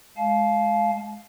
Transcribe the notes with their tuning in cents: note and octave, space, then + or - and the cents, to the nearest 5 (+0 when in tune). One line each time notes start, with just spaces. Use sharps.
G#3 +15 F5 +0 A5 -40